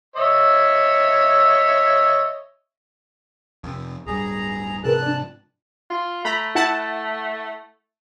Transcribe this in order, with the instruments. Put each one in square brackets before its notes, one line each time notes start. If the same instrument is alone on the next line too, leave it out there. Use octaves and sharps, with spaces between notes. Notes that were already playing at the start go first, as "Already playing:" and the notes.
[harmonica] C#5 D#5 E5
[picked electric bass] F2 C3
[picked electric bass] D1 G2 G3 [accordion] G#4 A#5
[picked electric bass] G#2 C3 F3 [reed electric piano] G#4 A#4 B4 [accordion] A5 F#6
[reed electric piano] D4 D5
[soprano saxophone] F4
[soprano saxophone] A3 [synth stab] A#5 B5
[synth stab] E4 F#5 A5